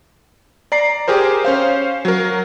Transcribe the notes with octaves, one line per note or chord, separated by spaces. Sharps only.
D5 A#5 C7
G4 G#4 A#4 C5
C#4 C5 F5
F#3 A#4